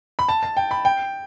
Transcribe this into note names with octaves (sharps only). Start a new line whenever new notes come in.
B5
A5
A5
G5
B5
G5